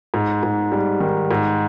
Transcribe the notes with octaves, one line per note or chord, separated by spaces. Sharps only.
G#2
G#2
G3
D#3
G#2